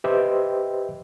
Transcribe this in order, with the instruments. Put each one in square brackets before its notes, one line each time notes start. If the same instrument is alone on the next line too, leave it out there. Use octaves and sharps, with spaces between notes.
[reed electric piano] G4 B4 C5 D#5 E5 G5